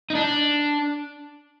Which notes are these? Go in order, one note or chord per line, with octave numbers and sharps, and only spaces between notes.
D#4
D4